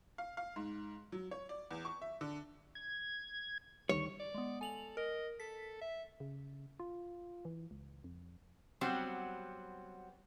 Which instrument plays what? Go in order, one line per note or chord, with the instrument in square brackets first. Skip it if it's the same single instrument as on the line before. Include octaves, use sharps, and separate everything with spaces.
[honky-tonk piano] F5
F5
G#2
F#3
C#5
D5
E2
C#6
E5
D3
[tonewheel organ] G#6
[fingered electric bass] D2 D#3 G3 [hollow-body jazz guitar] C#5 [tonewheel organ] C#6
[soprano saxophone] D5
[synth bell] G#3 B3
[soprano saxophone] A4 [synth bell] G#5 F7 F#7
[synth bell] A#4 [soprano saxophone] D#5
[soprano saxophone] A4 [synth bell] B6
[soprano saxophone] E5
[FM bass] C#3
F4
E3
C#2
F2
[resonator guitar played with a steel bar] F#3 G3 B3 C4